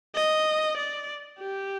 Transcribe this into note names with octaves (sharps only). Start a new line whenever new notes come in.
D#5
D5
G4